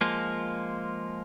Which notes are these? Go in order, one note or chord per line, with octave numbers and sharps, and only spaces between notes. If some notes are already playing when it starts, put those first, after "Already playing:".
F3 G#3 A#3 F4